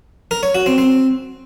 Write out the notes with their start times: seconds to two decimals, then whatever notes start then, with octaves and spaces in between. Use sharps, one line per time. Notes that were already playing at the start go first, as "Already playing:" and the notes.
0.31 A#4
0.43 C#5
0.55 F#4
0.66 C4
0.78 C4